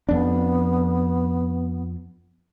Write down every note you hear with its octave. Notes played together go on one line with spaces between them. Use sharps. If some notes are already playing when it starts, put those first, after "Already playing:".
F2 B3 D4